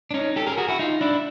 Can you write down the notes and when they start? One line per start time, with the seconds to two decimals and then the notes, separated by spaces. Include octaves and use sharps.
0.11 D4
0.14 C#4 D#4
0.36 G4 A4
0.47 G#4 A#4
0.58 F#4 G#4
0.69 E4 F#4
0.79 D#4 F4
1.01 D4 E4